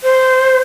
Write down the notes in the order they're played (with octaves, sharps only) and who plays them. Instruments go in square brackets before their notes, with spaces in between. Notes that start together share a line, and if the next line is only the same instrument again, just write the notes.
[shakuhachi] C5